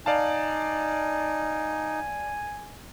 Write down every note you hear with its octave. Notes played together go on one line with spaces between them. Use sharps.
D#4 D5 F5 G#5 A5